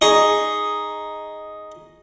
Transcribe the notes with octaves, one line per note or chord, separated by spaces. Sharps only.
D#4 G#4 C#6